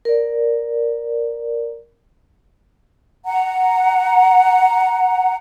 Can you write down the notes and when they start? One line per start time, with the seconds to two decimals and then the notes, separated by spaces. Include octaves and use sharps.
0.05 A#4 D5
3.26 F#5 A#5